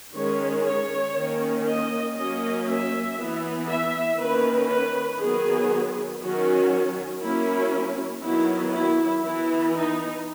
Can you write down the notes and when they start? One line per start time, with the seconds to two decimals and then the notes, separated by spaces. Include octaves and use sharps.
0.15 D#3 G#3 C#4 C#5
0.65 C#5
1.17 D#3 A#3 C#4
1.67 D#5
2.17 F#3 A#3 C#4 D#5
2.67 E5
3.18 E3 B3
3.69 E5
4.19 D#3 A#3 C#4 B4
4.69 B4
5.19 D#3 F#3 B3 G#4
6.21 D#3 F#3 C#4 F#4
7.21 F#3 A#3 C#4 E4
8.23 D#3 F#3 B3 E4
8.74 E4
9.23 E3 B3 E4
9.74 D#4